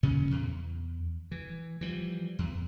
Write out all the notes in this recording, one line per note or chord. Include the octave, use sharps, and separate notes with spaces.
A#2 C#3 C#4
E2
E3
E3 F3 G3
E2